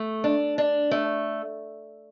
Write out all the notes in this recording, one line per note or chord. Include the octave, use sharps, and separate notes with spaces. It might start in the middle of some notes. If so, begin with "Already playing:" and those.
Already playing: A3
D4
D4
A3